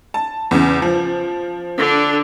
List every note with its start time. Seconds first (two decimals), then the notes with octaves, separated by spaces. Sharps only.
0.14 A5
0.51 E2 C#3
0.82 F3
1.78 D3 D4